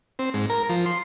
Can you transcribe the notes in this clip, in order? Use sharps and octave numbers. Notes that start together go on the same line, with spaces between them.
C4
G#2
A#4
F3
C6